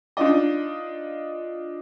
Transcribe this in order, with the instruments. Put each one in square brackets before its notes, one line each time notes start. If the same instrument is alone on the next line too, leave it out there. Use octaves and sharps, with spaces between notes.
[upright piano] D4 D#4 F4 D5 D#5